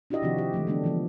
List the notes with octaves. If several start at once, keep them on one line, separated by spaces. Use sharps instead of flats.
D4 E4 F#4 G4 D#5 E5
C3 D#3 F3 C4 F#4 G4
G4
E3 F#3 G#3 A3
D3 G3 A3 B3 D4
D3 E3 F3 B3